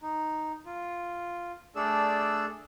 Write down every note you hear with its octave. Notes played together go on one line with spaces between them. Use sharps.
D#4
F4
A3 D4 G#4 A4 D5 E6